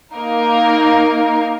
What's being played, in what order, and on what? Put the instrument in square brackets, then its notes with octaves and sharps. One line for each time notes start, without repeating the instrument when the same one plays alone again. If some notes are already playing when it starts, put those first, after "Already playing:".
[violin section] A#3 D#4 A#4